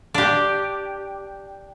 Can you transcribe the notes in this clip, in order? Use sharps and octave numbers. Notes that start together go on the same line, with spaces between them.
D4 G4